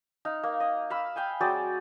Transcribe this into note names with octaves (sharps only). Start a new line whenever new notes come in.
D#4 F5
A#3
D#5
F5 B5 E6
F5 G5 G#5
F#3 C4 G#4 D5